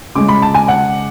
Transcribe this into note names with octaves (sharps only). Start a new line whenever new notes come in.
C#3 G#3 D6
B5
A5
G#5
F#5